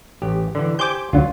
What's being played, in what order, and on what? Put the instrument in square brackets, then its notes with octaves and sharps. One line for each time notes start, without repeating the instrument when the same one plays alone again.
[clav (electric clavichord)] A1 G4
D3 E3
[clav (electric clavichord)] G4 C5 G#5 [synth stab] D6 G6
[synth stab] D2 D3 [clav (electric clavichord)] F#3 F4